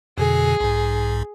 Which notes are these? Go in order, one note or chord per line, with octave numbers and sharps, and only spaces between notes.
F2 B2 D3 G#4
B1 G#2